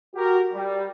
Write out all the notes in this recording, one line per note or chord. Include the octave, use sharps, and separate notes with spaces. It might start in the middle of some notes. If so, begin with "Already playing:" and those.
F#4 G4 A#4
G3